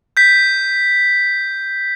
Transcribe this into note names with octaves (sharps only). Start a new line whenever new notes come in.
G6 B6